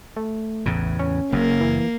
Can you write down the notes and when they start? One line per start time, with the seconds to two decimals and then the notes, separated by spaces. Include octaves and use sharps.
0.17 A3
0.66 A1 E2 A2 C#3
0.99 C#4
1.32 F#1 F#2 A#3
1.61 E3